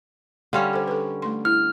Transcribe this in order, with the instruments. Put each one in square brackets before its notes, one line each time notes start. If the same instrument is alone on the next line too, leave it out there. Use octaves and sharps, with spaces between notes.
[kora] D3 G3 C#4 [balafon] F5 C6
[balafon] A4 C5
A4 B4
A3 C6
[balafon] E4 [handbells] F6